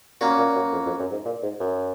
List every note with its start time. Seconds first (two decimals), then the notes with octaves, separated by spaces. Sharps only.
0.20 A#2 A#3 C#4 F#4
0.37 A#2
0.55 F#2
0.72 F2
0.85 F2
0.99 F#2
1.11 G#2
1.25 A#2
1.42 G#2
1.60 F#2